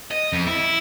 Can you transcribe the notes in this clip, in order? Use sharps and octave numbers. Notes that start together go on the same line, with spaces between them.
D#5
F2
E4